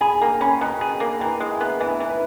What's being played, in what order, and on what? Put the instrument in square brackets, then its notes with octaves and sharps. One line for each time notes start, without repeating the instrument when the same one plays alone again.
[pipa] G#4 [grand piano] G#5 B5
[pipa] A#3 [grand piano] G5 A#5
[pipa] C#4 [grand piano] G#5 B5
[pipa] B2 [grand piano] G5 A#5
[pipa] G#4
A#3
[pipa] E3 [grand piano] G5 A#5
[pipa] G#3
[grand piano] E5 G#5
[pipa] B3
[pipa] E3 [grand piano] E5 G#5
[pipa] E3
[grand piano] B4